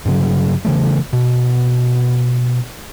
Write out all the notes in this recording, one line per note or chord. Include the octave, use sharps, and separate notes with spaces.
G2 C#3 F#3
C#3 E3 A3
B2